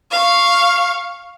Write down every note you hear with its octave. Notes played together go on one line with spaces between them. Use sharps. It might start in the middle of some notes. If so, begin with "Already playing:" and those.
F5 C#6